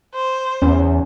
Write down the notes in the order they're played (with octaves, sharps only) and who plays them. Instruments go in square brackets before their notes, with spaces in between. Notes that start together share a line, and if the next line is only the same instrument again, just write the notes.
[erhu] C5
[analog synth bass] E2 [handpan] C#4